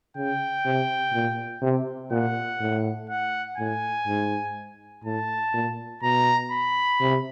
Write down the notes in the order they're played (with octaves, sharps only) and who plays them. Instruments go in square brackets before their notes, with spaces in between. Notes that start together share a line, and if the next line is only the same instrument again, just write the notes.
[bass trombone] C#3 [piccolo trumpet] G5
[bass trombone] C3
A#2
C3
[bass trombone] A#2 [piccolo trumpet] F#5
[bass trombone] A2
[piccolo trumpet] F#5
[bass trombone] A2 [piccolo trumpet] G#5
[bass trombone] G#2
[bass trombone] A2 [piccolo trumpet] A5
[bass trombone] A#2
[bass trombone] B2 [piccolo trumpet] A#5
[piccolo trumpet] B5
[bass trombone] C3